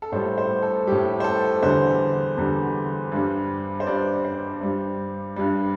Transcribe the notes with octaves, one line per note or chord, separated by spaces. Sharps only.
A4
A2 G3 C5
C5
A4
A2 G3 G4
C5
A4
E2 D3 G3 C5
E2 D3 G3
G2 G3
C5
G2 G3 D5
C5
G2 G3
G2 G3